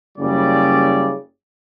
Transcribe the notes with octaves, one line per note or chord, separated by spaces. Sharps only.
F#1 C#3 G3 D5